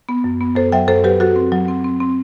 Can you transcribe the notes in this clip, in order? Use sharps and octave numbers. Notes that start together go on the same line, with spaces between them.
B3
F#2
B3
F#2 A4 C5
F#3 E5 G5
F#2 A4 C5
F#3 G4 B4
F#3 F#4 A4
C4
F#3
C4
C4
C4